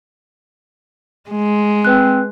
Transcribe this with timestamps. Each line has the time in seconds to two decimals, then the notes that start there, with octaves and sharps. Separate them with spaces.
1.31 G#3
1.85 C4 B4 F#6